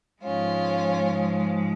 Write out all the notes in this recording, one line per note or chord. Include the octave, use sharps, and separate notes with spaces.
G#2 F3 G#3 C#4 F4